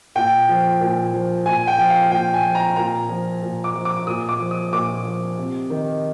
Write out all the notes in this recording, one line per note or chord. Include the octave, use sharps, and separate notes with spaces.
A#2 G5
F3
A#2
F3
A#2 G#5
G5
F3
F5
A#2 G5
G#5
F3
A#5
A#2 A#5
F3
A#2
D6
F3
D6
A#2 D#6
D6
F3
D#6
A#2 D6
F3
C3
D#3